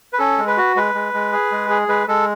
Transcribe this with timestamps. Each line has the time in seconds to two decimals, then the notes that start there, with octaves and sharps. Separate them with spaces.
0.13 B4
0.19 C#4 A4
0.38 G#3
0.47 B4
0.57 F#4
0.76 G#3 B4
0.95 G#3
1.14 G#3
1.32 G#4
1.52 G#3
1.70 G#4
1.88 G#3 B4
2.08 G#3 A4